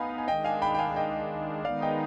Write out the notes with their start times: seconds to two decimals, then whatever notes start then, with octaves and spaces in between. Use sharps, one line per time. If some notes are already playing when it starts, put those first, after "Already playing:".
Already playing: B3 D#4 F5 G#5 B5
0.18 G#5
0.28 D#3 G#3 D4 D#5 G5
0.44 F5 G#5
0.62 G5 B5
0.74 G5
0.79 F5 G#5
0.96 D#5 G5
1.64 D#3 G#3 B3 D#4 D5 F5
1.82 D#5 G5